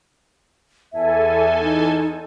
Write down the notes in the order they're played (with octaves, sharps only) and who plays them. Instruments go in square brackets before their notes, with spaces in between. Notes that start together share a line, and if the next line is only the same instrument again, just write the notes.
[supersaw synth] E2 A4 G#5 [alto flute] E5
[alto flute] D#4